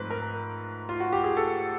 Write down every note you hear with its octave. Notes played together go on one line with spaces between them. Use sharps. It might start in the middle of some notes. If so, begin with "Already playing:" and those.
Already playing: G#2 F3 A3 C4 B4
A#4
F4
F#4
G4
G#4
A4